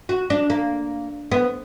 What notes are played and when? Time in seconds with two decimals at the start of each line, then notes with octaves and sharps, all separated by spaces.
0.09 F#4
0.30 D4
0.50 A#3
1.32 B3